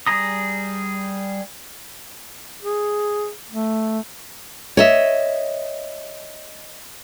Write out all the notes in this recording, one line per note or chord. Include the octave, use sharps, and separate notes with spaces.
G3 G#4 A#5 D#6
G#4
A3
C#5 D#5 E5